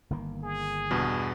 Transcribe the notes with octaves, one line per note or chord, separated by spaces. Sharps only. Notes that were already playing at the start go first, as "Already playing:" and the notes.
G1 D#3 A#3
G#4
E2 G2 B2